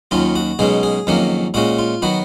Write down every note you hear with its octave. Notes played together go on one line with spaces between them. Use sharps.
D#2 D#3 F#3 C#4 F4
F#4
B1 B2 G#3 C#4 G#4
G#4
F2 D#3 F#3 A#3 C#4
A#2 G#3 C#4 F#4
F4
D#3 F#3 B3 F#4